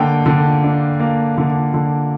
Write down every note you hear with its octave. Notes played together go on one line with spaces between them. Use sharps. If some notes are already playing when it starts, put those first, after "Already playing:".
Already playing: D3 A#3 G5
D3
D4
A#3
D3
D3